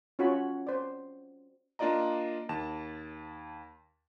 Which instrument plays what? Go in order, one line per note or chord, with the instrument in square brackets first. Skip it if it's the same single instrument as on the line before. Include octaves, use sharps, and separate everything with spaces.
[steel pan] C#4 F4 F#4 C#5 B5
C5 D5
[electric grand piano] A#3 D4 F4 D5 D#5 A#5
D#2 A5 E7